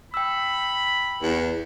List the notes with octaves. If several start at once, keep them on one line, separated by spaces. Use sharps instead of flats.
G5 B5 E6
E2